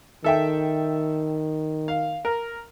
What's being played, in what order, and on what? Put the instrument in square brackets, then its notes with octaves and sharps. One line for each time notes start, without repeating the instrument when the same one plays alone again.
[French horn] D#3 [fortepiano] A4 E5 G5
[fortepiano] F5
A#4